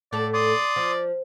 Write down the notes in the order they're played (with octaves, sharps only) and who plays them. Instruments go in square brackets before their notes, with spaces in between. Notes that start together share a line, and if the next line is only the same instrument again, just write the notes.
[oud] A2 A4 [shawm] D5
[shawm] D5 [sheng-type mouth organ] C6 D#6
[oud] F3